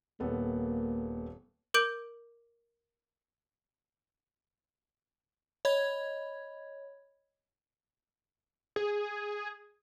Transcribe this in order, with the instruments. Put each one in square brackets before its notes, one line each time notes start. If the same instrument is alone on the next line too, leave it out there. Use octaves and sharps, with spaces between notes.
[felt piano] D#1 B3 A4 [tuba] A#3
[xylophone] A#4 D6 G6 D7 F#7
[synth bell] C#5 D#5 B5 G#6
[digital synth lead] G#4